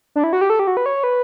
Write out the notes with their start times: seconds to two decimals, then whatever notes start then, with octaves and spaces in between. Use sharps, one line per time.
0.16 D4
0.24 E4
0.33 F#4
0.41 G4
0.50 A4
0.59 G4
0.67 F#4
0.77 B4
0.86 C#5
1.04 B4